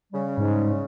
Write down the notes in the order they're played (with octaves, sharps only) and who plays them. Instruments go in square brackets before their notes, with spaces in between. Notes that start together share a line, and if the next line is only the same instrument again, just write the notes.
[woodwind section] C#3 G3
[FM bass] G#2